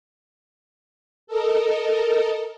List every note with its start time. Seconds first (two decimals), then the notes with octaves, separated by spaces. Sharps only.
1.27 A4 A#4 D#5